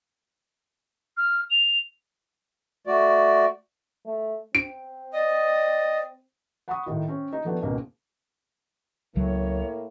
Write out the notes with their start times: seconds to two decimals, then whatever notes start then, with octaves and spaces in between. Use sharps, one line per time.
1.16 F6
1.49 F7
2.87 A3 F#4 D5
4.06 A3
4.55 C4 D7
5.13 D5 D#5
6.68 F#5 B5 C#6 D#6
6.86 A2 D#3
7.08 C4 C#4
7.33 D#4
7.44 F3 A3 B3 C4 D4
7.62 C#2 G#2 B2 A#3 C4
9.16 C#2 A2 C#3 F#3 A#3 C#5